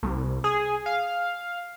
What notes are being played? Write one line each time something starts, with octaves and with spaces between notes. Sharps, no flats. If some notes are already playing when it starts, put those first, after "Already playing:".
C2
G#4
F5